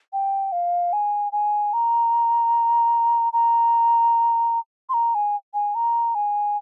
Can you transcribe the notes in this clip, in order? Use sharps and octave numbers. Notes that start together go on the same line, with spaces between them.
G5
F5
G#5
G#5
A#5
A#5
C6
A#5
G#5
G#5
A#5
G#5